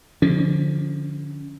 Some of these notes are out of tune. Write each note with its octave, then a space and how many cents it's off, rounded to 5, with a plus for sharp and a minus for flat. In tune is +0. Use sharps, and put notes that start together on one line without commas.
D3 +0 F3 +0 C#4 +20